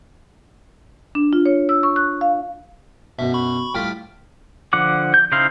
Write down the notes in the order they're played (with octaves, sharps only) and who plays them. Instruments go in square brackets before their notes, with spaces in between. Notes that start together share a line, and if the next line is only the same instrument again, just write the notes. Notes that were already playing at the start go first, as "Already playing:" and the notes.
[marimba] D4
F4
C#5
E6
C#6
F#6
F5
[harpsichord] F#2 B2 [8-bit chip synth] E5
[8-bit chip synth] B5 C#6
[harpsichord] A2 G3 F4 [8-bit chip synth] G5 F6 B6
[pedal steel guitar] D3 F3 F#5 D6
G6
C#3 D#4 E4 C5 F5